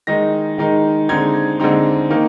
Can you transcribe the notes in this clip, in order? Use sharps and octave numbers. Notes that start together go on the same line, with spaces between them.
D#3 G#3 D#4 A#6
D#3 G#3 D#4
D3 G#3 C4 D#4 G#6
D3 G#3 C4 D#4
D#3 A#3 D#4